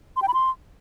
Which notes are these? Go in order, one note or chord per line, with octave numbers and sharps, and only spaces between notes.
C6
G5
B5
C6